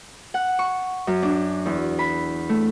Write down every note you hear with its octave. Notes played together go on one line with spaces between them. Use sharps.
F#5
C#6
F#2
D4
E2
B5
A3